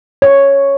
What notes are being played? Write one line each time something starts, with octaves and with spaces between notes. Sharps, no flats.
C#5